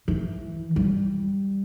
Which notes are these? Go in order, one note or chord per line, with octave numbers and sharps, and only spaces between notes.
E3
G3